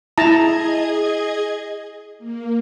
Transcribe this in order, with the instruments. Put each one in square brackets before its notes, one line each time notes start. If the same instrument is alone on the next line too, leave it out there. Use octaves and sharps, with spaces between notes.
[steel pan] E4 A5 A#5 [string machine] G#4 D#5 G#6
[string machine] A#3